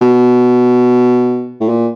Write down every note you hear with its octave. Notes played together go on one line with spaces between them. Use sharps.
B2
A2
A#2